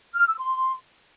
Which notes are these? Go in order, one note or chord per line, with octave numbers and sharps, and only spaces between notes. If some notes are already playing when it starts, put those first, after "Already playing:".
F6
E6
C6